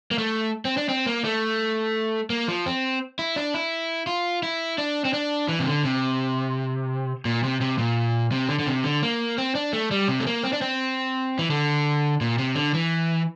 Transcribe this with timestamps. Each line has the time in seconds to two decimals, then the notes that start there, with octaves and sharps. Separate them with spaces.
0.11 A#3
0.18 A3
0.65 C4
0.77 D4
0.89 C4
1.06 A#3
1.24 A3
2.30 A#3
2.48 F3
2.66 C4
3.19 E4
3.36 D4
3.54 E4
4.07 F4
4.43 E4
4.78 D4
5.05 C4
5.13 D4
5.48 E3
5.59 C3
5.66 D3
5.84 C3
7.25 A#2
7.43 C3
7.61 C3
7.78 A#2
8.32 C3
8.49 D3
8.59 D3
8.67 C3
8.84 D3
9.03 A#3
9.38 C4
9.55 D4
9.73 A3
9.91 G3
10.08 C3
10.20 A3
10.27 A#3
10.44 C4
10.53 D4
10.62 C4
11.39 E3
11.50 D3
12.21 A#2
12.38 C3
12.56 D3
12.74 E3